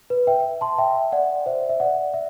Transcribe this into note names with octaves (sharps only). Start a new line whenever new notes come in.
B4
E5 G5
A5 C6
E5 G5
D5 F#5
C5 E5
E5
D5 F#5
E5